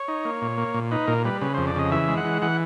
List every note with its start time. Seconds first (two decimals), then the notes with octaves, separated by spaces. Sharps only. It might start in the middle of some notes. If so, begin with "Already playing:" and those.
Already playing: C#5
0.08 D#4
0.25 A#3
0.42 A#2
0.58 A#3
0.74 A#2
0.91 D#4 B4
1.08 A#2 A#4
1.25 G3 B4
1.41 C#3 B4
1.54 F2 C5
1.67 D5
1.76 C#3 D#5
1.91 E3 E5
2.08 G#3
2.17 F#5
2.24 E3
2.42 E3 F#5